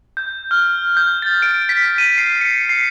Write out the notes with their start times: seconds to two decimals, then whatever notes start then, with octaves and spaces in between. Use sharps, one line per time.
0.17 G6
0.51 F6
0.97 G6
1.22 A6
1.42 D7
1.69 B6
1.98 D#7
2.18 C7
2.41 C#7
2.69 C7